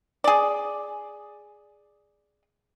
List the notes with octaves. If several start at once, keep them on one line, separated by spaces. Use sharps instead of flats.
G#4 D5